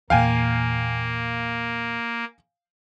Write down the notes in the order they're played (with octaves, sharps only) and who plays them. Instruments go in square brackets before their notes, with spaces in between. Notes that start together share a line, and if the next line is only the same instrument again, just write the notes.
[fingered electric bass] E2 A#2 [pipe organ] A#3 [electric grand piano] F5 G5 G#5